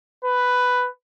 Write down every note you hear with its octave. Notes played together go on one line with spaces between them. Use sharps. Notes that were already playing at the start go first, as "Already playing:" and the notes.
B4